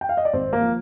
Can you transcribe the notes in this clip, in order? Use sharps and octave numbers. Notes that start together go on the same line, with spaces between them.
G5
F5
D#5
D5
G#1 C4 C5
A#3 A#4
F3